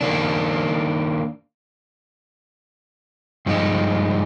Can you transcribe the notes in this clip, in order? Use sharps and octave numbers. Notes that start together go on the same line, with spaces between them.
D#3 A#3 D4
G2 F3 G#3 D#4